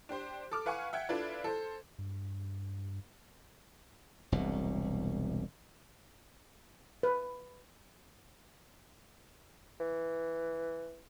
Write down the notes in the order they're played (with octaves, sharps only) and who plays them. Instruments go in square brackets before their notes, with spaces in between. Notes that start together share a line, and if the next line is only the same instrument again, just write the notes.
[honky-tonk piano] D4 G4 C5 C6
A4 D6 F6
B4 F5 F#5 G#5 C#6
E5 F#5 G5 G#6
D4 E4 F4 A4 B4 D5
A4 C5
[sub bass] G2
[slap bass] E1 C2 B2
[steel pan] B4
[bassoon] E3